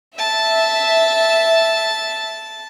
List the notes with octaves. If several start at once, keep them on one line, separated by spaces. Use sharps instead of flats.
E5 A5